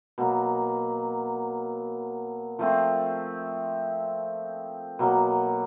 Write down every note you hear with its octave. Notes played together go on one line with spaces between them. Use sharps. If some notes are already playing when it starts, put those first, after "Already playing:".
B2 F#3 A#3
F3 A3 C4
B2 F#3 A#3